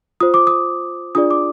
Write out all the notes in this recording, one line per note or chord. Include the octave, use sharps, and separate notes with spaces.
F4 C5 D#6
D6
D#6
D4 F4 G#4 D5 D#6
D6